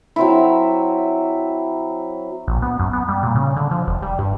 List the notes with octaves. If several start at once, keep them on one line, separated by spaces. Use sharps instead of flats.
F#3 C4 E4
A#1
B3
F#2
B3
G3
A#2
C#3
D3
F3
F1
G3
G2